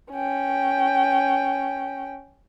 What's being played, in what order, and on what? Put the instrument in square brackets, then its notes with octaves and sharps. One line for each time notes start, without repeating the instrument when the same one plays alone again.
[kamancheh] C#4 G5